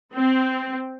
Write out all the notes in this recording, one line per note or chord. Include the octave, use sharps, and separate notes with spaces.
C4